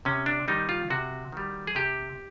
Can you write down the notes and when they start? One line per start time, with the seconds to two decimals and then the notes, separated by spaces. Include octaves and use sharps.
0.05 C3 C#4
0.26 D4
0.48 D#3 G3 D#4
0.69 F4
0.90 C3 F#4
1.32 D#3 G3
1.67 G#4
1.75 C3 G4